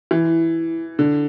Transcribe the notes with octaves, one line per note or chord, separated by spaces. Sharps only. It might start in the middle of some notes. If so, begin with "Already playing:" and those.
E3
D3